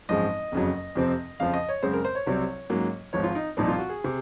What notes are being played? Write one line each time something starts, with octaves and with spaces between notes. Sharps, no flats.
G#1 F#2 F3 G#3 D#5
F#1 F2 C#3 F#3
F2 C3 F3 C4
F2 C#3 F3 F5
D#5
C#5
F#2 C#3 G#3 C4 C5
A#4
C5
C#5
C2 C3 F#3 C4
G#2 F#3 A#3 C#4
G#1 G#2 F3 C#5
F4
D#4
C2 A#2 F3 C4 D#4
F4
F#4
G#4
C3